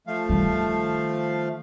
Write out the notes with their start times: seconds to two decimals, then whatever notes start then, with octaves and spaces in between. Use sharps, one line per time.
0.07 F3 A3 F5
0.29 D#3 G3